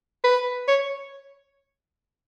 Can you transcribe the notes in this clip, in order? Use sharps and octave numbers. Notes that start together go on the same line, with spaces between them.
B4
C#5